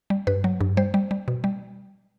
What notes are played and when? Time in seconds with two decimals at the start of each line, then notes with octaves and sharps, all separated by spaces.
0.10 G3
0.27 G2 B4
0.44 F#3
0.61 G2
0.77 G3 C5
0.94 G3
1.11 G3
1.28 B2
1.44 G3